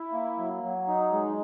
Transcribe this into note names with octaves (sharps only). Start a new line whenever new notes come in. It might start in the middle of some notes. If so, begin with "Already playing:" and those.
Already playing: E4
A#3
F#3
F#3
D#4
G#3